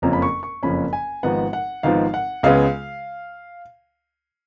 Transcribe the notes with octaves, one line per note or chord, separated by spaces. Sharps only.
F#1 F2 F3 A#3 C#4 A#5
B5
C#6
C#6
F#1 F2 F3 A#3 C#4 B5
G#5
G#1 G#2 F3 B3 F#5
F#5
G#1 G#2 F3 B3 F5
F#5
C#2 C#3 G#3 B3 F5